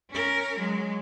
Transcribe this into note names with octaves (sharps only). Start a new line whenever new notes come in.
C#4 A#4
F#3 G#3